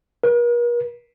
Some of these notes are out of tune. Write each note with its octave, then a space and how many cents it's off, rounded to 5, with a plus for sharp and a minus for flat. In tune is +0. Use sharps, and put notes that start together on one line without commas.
A#4 +45